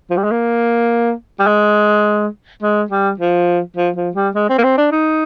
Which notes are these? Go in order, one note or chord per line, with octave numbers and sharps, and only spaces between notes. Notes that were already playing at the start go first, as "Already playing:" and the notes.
F3
G3
G#3
A#3
G3
G#3
G#3
G3
F3
F3
F3
G3
G#3
C4
A#3
C4
D4
D#4